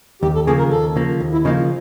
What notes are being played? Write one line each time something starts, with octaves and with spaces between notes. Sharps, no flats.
D#2 G4
A4
C#3 F3 A#3 G#4
A#4
D#2 A4
C#3 F3 A#3
D#2
E4
C#3 F3 A#3 D#4